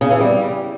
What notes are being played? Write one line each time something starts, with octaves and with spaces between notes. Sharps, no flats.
C#3
E3
G3